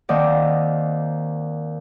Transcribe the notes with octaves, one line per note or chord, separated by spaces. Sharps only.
D#2 D#3 C4 D5 D#5 F#5